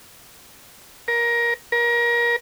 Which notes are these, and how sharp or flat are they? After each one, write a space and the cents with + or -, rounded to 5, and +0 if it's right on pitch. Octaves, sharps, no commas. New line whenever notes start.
A#4 +20
A#4 +30